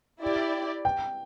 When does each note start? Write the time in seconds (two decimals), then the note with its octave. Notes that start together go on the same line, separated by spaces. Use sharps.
0.22 E4 G4 D5
0.85 G5